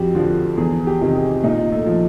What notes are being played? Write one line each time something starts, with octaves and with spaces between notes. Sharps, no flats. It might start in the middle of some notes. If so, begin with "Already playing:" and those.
Already playing: F2 F#4 G4
D3 F3
E2 G#4
G4
C3 D#3
G#4
A#2 D#4
A3
F3